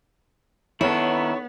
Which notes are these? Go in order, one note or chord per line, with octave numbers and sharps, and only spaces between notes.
D#3 B3 E4 A4 C#5